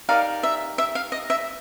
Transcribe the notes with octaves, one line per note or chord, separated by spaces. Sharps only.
D#4 G4 A#4 D5 F5
E5
E5
F5
D#5
E5